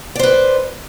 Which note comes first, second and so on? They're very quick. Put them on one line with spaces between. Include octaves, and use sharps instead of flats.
D5 C5 B4